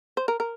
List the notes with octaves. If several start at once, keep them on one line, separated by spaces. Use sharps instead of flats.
C5
A#4
A#4